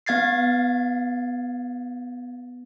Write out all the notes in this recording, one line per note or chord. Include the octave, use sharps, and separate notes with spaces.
B3 F5 G#6 A6 C7